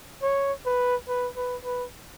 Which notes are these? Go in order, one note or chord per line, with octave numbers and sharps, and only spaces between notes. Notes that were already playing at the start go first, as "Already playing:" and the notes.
C#5
B4
B4
B4
B4